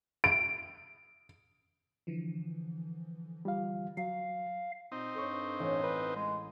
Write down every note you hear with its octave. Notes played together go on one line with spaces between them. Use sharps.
D7
D3 E3 F3
G3 F4 F5
F#3 F5
A#2 C4 D#4
G2 A4 C5 C#6
A1
B4
G#3